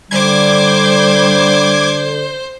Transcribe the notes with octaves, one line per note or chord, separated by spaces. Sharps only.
D3 G3 C5 D6 G#6